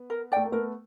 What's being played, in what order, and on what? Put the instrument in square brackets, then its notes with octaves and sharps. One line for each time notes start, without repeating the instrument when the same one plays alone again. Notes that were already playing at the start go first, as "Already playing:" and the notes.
Already playing: [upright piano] B3
[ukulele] A#4
[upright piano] A3 [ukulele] D5 G5
[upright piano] A#3
[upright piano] A3 B3 [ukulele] A#4